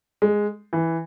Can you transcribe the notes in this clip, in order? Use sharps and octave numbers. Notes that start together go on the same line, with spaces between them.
G#3
E3